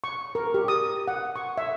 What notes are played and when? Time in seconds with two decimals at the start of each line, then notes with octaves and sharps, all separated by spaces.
0.04 C#6
0.35 A#4
0.54 G4
0.68 D#6
1.08 F#5
1.36 C#6
1.58 E5